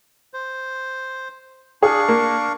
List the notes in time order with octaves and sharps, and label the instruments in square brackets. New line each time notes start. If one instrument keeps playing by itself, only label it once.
[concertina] C5
[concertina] D4 F5 C#6 [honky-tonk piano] G#4
[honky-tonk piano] A#3